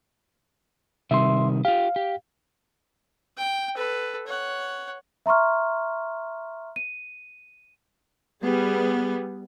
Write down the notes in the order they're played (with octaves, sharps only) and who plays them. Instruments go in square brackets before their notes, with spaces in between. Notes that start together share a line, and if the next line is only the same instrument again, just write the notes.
[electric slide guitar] C3 D#3 G3 [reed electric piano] E5 C6
[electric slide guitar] F4 G4 [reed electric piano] F5
[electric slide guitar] G4
[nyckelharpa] G5
A4 B4
C#5 F#5
[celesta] E5 A#5 C6 C#6 F6
D#7
[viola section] G3 B3 G#4